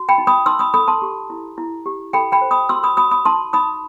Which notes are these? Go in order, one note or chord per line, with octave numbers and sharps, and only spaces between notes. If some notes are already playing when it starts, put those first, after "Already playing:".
Already playing: F#4
G5 B5
D#4
B5 D#6
D#4 C6 E6
B5 D#6
A4 B5 D#6
A5 C6
G4
E4
E4
G4
A4 G5 B5
G5 B5
C5
B5 D#6
F#4 C6 E6
B5 D#6
F#4 B5 D#6
B5 D#6
D#4 A5 C6
D#4 B5 D#6